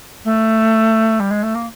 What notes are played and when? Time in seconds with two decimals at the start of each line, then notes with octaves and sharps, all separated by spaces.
0.24 A3
1.19 G3
1.30 G#3
1.42 A3
1.54 A#3